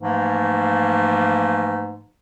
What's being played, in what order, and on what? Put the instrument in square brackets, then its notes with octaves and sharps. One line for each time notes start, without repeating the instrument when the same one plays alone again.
[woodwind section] G#2 E3 F3 A3 A#3